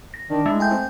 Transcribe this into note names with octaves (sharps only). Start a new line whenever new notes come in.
A#6
D#3 D4
G#3 A3 E4
A3 G5 G#5 G6
C4